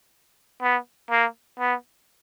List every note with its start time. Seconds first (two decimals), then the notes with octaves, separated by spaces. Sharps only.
0.62 B3
1.11 A#3
1.59 B3